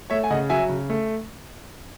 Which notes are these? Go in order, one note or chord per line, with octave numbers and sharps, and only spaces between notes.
A3 C#5 E5
G#5
C#3 D#5 F#5
F#3 E5 G#5
C#3
A3